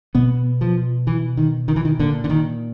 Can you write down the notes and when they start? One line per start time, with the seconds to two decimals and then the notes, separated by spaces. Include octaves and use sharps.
0.15 B2 B3
0.61 F3
1.07 E3
1.37 D#3
1.68 D#3
1.76 E3
1.85 D#3
1.99 A#2 D3
2.24 D3
2.30 D#3